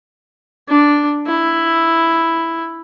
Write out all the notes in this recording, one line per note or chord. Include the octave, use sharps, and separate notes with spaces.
D4
E4